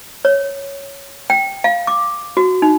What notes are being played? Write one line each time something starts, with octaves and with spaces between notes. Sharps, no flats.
C#5
G5
F5
D6
F#4
D#4